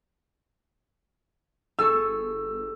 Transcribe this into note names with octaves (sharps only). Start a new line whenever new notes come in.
G1 G#4 A4 C#6 E6